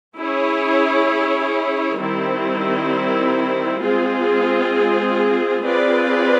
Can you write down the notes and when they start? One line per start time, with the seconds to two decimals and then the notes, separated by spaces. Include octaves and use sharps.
0.16 C#4 E4 G#4 C#5
1.98 D#3 G3 C4 E4
3.81 G#3 C4 F4 G#4
5.63 C4 F4 G#4 B4 D5